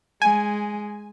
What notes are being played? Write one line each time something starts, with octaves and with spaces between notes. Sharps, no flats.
G#3 G#5